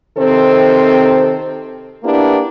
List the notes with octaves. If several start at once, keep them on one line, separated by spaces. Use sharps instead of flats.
C3 D#3 C4 A4 C5
A#3 B3 D4 E4 G4